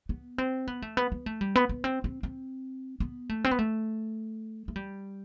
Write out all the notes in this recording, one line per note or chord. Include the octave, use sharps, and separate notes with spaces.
B3
C4
B3
A3
B3
B3
A3
G3
B3
B3
C4
C4
C4
B3
A3
C4
B3
A3
A3
G3